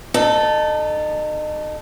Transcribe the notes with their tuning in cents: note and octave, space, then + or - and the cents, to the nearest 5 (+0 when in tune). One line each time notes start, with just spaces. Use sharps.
D#4 -30 A4 +0